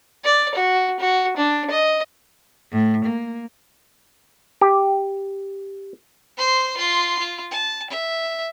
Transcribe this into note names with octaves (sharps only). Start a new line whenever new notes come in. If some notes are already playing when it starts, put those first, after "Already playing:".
D5
F#4
F#4
D4
D#5
A2
A#3
G4
C5 C6
F4 C6
F4
A5
E5